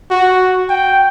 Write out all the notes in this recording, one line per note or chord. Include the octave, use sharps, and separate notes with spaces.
F#4
G5